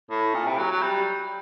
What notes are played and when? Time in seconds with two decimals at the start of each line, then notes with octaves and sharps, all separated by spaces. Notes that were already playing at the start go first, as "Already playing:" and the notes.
0.10 A2
0.34 A#2
0.46 C3
0.58 F#3
0.71 F#3
0.82 G3